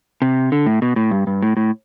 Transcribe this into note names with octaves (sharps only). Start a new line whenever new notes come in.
C3
D3
A2
B2
A2
G2
G2
A2
A2